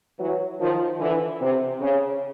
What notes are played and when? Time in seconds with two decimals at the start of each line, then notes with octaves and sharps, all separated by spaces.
0.20 E3 F#3
0.60 D#3 F3
1.00 D3 E3
1.41 C3
1.81 C#3